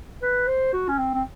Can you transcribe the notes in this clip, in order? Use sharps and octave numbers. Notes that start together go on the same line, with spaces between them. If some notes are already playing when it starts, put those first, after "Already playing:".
B4
C5
F#4
C#4
C4
C4